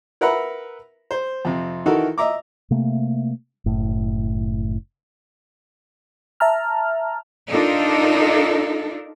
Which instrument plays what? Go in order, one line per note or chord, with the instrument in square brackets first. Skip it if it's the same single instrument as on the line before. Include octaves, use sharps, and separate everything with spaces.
[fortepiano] A#4 B4 E5 F#5 A#5 B5
C5
F2 C3
D#3 E3 D#4 F#4 A4 A#4
D#5 E5 A#5 D6
[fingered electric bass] C3 A3 A#3
F#1 A2
[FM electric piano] E5 A5 A#5 F6
[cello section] D4 D#4 F4 A4 A#4